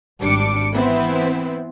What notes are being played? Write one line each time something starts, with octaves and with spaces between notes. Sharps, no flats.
G#1 G3 D4 D6 C#7
E3 B3 C4 E4